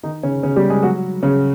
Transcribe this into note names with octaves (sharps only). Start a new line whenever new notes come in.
D#3 D#4
C#3 C#4
C#3 C#4
G3 G4
G#3 G#4
F#3 F#4
C#3 C#4